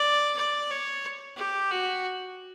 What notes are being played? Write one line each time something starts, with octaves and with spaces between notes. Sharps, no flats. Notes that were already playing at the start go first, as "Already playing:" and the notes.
Already playing: D5
D5
C#5
G4
F#4